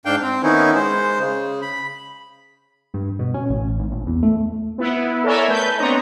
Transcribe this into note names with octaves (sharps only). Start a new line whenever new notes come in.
G#2 D4 F5 G5 G6
C4
D#3 B3 C#4 D#4 E4
G#3 C5
C#3
B5
G2
B2
C#4
A1
G#1
A#1
E2
A3
B3 E4
A4 A#4 C#5 D5 E5 G#5
A3 B4 G6
B3 C4 D4 C#5 D#5 A#5